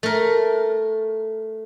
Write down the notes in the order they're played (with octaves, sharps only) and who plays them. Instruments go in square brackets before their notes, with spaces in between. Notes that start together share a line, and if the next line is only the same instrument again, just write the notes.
[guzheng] A3 A#4